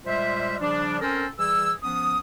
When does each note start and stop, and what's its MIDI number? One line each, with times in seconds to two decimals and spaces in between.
0.06 0.57 46
0.06 0.57 55
0.06 0.57 56
0.06 0.57 72
0.06 0.57 76
0.61 1.00 49
0.61 1.00 53
0.61 1.00 55
0.61 1.00 62
1.02 1.26 60
1.02 1.26 61
1.02 1.26 69
1.02 1.26 70
1.02 1.26 72
1.02 1.26 80
1.39 1.72 52
1.39 1.72 55
1.39 1.72 68
1.39 1.72 88
1.83 2.18 53
1.83 2.18 59
1.83 2.18 61
1.83 2.18 87